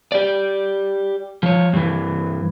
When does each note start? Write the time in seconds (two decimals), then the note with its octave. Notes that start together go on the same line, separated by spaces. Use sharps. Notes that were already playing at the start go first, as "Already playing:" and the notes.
0.12 G4 D5
1.43 F3 C#5
1.73 G2 E3